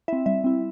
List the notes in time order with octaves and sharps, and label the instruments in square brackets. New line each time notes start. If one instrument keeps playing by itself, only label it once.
[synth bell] C4 E4 E5
G3 E5
C4 E4